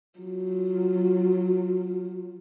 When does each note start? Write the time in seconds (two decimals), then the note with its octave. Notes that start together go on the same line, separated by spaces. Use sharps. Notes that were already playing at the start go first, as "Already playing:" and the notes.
0.19 F#3 F4